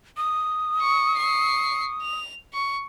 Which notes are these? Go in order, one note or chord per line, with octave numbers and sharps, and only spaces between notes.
D#6
C#6
C#6 C7
F7
C#6